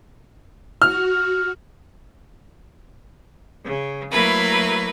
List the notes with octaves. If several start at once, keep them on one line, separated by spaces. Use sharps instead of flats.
F#4 F6
C#3
F#3 A3 A#3 E4 A#4 B4